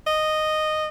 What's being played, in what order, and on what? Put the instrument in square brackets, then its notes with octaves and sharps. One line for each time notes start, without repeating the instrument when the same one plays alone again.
[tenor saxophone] D#5